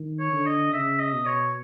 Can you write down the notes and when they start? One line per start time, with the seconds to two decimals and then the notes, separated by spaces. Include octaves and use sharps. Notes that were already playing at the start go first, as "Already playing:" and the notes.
Already playing: D#3
0.19 C#5
0.32 D3
0.46 D#5
0.73 C#3 E5
0.99 D#5
1.13 B2
1.26 C#5